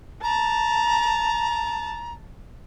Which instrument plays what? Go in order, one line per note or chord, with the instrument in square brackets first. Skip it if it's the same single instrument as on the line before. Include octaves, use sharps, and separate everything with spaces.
[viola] A5 [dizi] A#5